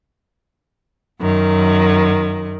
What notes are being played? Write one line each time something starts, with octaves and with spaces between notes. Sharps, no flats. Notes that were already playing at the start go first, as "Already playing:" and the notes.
F#2 D#3